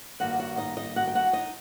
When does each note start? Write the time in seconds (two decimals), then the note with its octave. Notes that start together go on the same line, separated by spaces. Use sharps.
0.20 G2 D#3 G3 A#3 F#4 F#5
0.39 F#4 F#5
0.57 D#4 D#5
0.77 D#4 D#5
0.96 F#4 F#5
1.07 G5
1.15 F#4 F#5
1.33 D#4 D#5